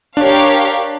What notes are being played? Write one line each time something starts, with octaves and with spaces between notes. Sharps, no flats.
D4 G4 A#4 C#5 F5